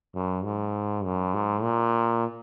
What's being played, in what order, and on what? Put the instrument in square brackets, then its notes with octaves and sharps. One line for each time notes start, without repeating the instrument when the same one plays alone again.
[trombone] F#2
G#2
F#2
G#2
A#2